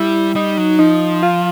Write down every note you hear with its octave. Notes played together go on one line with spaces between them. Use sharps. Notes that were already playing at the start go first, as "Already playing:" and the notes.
Already playing: G3 E4
G3 D#4
F#3
F3 D#4
F4